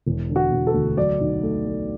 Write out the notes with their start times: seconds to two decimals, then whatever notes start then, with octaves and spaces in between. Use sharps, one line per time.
0.06 E1
0.29 D3
0.36 F#4
0.51 E1
0.67 A4
0.74 D2
0.97 F#3 D5
1.20 B1
1.43 A3
1.66 A3